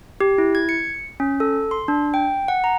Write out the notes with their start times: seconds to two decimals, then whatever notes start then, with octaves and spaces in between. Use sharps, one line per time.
0.21 G4
0.38 E4
0.55 G#6
0.69 C#7
1.20 C#4
1.40 A4
1.71 C6
1.88 D4
2.14 G5
2.48 F#5
2.64 A#5